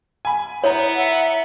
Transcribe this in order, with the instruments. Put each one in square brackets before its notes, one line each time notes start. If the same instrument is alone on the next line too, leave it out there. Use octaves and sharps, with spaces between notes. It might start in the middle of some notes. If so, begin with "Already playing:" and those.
[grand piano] G#5 B5
[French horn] B3 [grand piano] E4 A#5 [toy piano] C#5
[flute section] E5 F#5